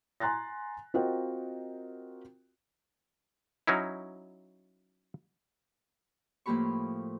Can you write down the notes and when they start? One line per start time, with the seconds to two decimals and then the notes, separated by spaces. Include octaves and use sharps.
0.20 G#5 A#5 C6 F#6 A6 A#6
0.94 C4 F4 F#4 A#4 D#5 G5
3.67 F#3 C#4 D#4 E4
6.46 A2 F3 A#3 G4 B5 C#6